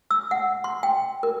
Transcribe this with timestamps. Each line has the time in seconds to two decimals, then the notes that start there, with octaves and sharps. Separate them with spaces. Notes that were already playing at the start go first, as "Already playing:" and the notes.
0.11 E6
0.31 F#5
0.64 C6
0.83 G5
1.23 A#4